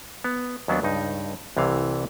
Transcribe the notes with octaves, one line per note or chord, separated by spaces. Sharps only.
B3
D#2 F#3 B3 D4
C#2 G2 D#4
C2 C3 E3 F5